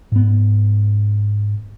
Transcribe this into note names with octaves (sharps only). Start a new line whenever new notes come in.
G#2 B3